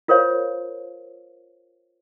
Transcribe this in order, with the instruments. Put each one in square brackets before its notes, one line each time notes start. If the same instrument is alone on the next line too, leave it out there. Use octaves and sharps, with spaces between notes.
[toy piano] F4 A#4 C5 C#5 F5